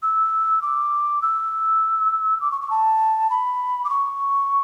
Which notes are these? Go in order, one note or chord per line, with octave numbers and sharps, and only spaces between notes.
E6
D6
E6
D6
C#6
C#6
A5
B5
D6
C#6